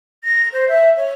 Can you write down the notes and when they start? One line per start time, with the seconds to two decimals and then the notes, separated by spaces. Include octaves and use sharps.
0.24 A#6
0.52 C5
0.68 E5
0.97 C#5